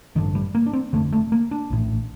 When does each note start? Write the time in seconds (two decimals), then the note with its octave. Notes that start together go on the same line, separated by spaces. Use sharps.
0.15 A1 G2 D3 D#3
0.35 G3
0.55 A#3
0.66 D4
0.73 C4
0.93 F1 D#2 D3 A3
1.12 A3
1.32 A#3
1.51 D4
1.70 A#1 A2